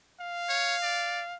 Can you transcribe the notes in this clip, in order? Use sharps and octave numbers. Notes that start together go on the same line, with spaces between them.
F5
C#5
D5